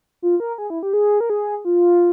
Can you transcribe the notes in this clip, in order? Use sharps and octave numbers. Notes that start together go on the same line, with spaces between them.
F4
A#4
G#4
E4
G4
G#4
A#4
G#4
F4